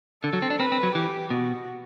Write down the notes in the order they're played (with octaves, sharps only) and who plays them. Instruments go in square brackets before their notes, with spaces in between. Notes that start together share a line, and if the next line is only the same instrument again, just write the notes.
[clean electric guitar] D3 [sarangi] A4
[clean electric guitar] F#3
C4
D4
[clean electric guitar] C4 [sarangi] B4
[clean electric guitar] C4
F#3
[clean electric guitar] E3 [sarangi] G4
[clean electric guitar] B2 [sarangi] F#4